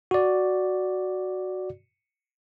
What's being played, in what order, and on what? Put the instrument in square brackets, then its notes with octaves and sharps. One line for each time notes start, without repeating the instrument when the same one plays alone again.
[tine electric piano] F#4 D5